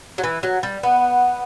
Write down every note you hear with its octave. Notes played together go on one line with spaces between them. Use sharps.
F#3
E3
F#3
G3
B3